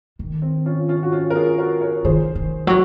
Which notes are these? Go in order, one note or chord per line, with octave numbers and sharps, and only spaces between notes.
D#3
C4
C#4 F4
C#4 F4
F#4
C#4 F4
A#4
F4 G#4
F#4 A#4
A#4 C#5
D#3 G#4 C5
D#3
F#3